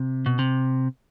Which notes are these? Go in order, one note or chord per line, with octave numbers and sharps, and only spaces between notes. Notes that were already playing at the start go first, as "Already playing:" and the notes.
Already playing: C3
B2
C3